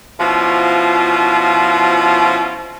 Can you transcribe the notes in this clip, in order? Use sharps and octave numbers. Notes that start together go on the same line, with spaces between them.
B2 F3 C#4 E4 F4